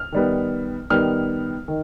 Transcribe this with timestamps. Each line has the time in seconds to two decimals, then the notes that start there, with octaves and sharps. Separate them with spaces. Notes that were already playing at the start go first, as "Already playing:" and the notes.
Already playing: F6
0.12 D#3 G3 B3
0.90 D#3 G3 B3 F6
1.68 D#3